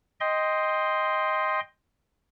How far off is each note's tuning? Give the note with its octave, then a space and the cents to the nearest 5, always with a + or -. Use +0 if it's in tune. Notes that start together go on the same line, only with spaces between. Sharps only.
D#5 +5 G5 +10 C6 +0